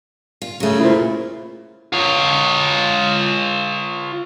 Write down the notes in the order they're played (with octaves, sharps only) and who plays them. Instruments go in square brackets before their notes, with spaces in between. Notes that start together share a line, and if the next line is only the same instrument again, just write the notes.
[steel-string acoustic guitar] F4
[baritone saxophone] C#3 [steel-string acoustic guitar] F#3 A3
[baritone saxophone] A#2 [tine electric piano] E4 C5
[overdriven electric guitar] F4 C#5